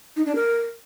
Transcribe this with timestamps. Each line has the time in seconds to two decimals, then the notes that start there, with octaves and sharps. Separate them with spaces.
0.16 D#4
0.26 D4
0.35 A#4